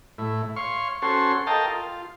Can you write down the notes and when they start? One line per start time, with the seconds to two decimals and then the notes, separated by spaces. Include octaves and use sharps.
0.18 A2 E4
0.56 C#5 F5 C6 C#6
1.02 C#4 F#4 A4 C5 C#5 C6
1.47 A4 A#4 D#5 F5 G5 A5
1.68 F4